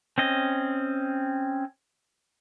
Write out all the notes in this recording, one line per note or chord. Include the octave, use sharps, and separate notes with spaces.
C4 C#4 D#5